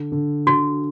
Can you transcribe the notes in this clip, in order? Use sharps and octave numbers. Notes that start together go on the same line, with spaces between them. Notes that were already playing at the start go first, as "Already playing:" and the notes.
Already playing: D3
D3
D3 F#4